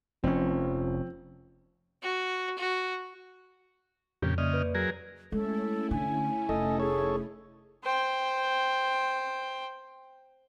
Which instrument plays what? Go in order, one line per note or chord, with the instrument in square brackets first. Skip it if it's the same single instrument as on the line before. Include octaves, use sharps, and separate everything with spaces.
[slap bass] F1 C#4 [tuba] F3 [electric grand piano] C4
[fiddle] F#4
F#4
[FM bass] F2 [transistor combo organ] A#2 C#3 G4
[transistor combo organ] C#3 D#5 F6 [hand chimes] A#3 D5
[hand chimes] B4 C#5
[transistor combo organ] F#3 G#4 A#4
[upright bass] G#3 [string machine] A3 C#4 E4 [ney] A4
[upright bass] D3 [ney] G#5
[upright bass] F1 [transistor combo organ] A4 D#5
[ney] G#4 [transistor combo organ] A4 C#5
[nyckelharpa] C5 G5